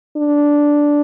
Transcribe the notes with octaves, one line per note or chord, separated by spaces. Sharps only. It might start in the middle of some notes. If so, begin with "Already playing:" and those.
D4